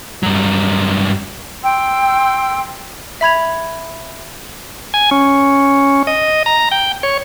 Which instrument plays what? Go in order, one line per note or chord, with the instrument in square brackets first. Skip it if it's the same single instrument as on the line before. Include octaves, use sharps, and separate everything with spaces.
[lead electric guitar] G2 F#3
[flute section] G5 C6 E6
[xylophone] E5 B5 G#6 F7
[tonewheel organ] G#5
C#4
D#5
A#5
G5
C#5